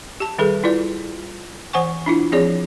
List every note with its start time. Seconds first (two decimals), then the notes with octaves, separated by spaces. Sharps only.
0.20 G4 A5
0.39 D#3 G3 G#4 A4 B4
0.64 E4 F4 B4 D5
1.73 E3 C5 F#5 G#5 C#6
2.06 D4 E4 F4
2.32 F3 C4 G#4 C#5 D5